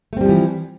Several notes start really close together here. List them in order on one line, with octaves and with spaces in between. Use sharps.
A3 C4 G3 F3 E3